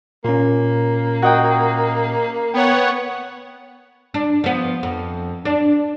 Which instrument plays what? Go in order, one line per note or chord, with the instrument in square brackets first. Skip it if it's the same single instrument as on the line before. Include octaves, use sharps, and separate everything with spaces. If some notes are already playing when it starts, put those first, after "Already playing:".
[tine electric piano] A#2 C#4 [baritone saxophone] A#3
[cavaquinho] F#4 D#5 G5
[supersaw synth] B3 C#5 F#5 [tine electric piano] G5
[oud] D4
F3 B3
F2
D4